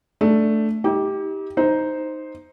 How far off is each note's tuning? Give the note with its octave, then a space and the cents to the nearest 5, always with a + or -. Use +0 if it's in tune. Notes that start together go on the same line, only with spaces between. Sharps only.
A3 +0 D4 +0
D#4 +40 G4 +0
D#4 +0 C5 +0